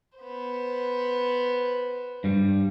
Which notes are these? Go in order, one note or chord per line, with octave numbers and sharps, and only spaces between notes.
B3 C5
G2 G3